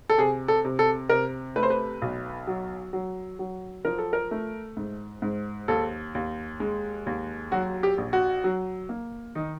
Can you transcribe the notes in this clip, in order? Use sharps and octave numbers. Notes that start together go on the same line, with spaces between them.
A4
C3 G#4
A4
C3
A4
C3 A#4
A3 B4
C5
B4
B1
F#3
F#3
F#3
F3 A#4
A4
A#4
A3
G#2
G#2
D#2 A4
D#2
G#3
D#2
F#3 F#4
G4
A#1
F#4
F#3
A#3
D#3 D#4